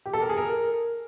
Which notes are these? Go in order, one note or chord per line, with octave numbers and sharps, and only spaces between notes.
G4
A4
A#4
G#4
A#4